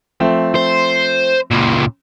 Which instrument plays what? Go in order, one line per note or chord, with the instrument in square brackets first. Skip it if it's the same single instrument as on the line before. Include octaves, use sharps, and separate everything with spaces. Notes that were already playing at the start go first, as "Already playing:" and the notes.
[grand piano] F3 A3 C4
[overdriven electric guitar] C5
C#2 A#2